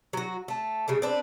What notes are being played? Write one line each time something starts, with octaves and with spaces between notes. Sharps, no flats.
F#3 F#4
A3 A5
C#3 G3 A3
C4 D4 B4